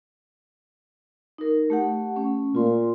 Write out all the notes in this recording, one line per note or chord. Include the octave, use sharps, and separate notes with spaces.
D#4 A#4
A3 G4 F#5
A3 C#4
A#2 F4 C6